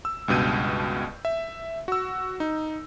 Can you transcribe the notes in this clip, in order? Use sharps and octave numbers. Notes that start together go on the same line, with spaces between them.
E6
C#2 G2 B2 G6 D#7
E5
F#4 E6
D#4